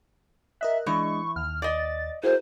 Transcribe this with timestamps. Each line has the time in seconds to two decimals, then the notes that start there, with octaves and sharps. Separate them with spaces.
0.61 A#4 D#5 E5 F#6
0.86 E3 G#3 D4 D#5 C#6
1.36 D#2 F6
1.62 D5 D#5 A6
2.24 E4 F#4 G#4 A#4 C5